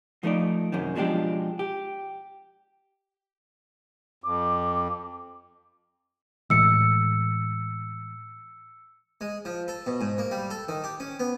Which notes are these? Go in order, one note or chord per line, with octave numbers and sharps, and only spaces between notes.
F3 A3 D#4 D5
F#2 C3 D#3
B2 F3 G#3 D4 G4
G4
F2 D6
A2 E3 G#3 E6 C#7
G#3
F3
A4
B2
G#2
A#3
G3
A4
D#3
G4
C#4
B3